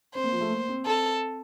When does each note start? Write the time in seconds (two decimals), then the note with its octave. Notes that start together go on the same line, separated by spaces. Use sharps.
0.15 C4 C5
0.24 A#3
0.32 F3
0.41 A3
0.50 A#3
0.68 C4
0.86 C4 A4